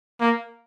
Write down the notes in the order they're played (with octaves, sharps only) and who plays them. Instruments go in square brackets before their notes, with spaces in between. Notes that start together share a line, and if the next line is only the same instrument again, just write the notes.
[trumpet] A#3